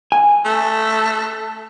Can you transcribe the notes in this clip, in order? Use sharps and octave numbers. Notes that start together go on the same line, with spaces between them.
G#5
A3